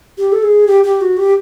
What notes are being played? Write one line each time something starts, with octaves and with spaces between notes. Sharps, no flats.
G4
A4
G#4
G4
G4
F#4
G4